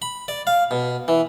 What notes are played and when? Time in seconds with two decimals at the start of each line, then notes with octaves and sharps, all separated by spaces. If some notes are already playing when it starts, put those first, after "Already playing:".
0.02 B5
0.28 D5
0.47 F5
0.71 B2
1.08 E3